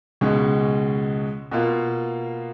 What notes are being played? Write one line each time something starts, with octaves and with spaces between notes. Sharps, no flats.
C#2 B2 G#3 C#4
B2 A#3 F4